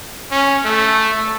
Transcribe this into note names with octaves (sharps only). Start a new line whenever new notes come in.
C#4
A3